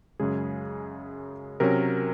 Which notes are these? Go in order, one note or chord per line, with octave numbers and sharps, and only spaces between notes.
F#2 C#3 G#3 G#4
C3 F#3 C#4 A#4